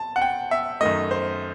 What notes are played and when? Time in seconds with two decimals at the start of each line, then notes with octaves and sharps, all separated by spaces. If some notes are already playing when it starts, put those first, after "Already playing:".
Already playing: A5
0.16 F#5
0.21 G5
0.51 E5
0.81 F#2 D#3 A3 D#5
1.11 C5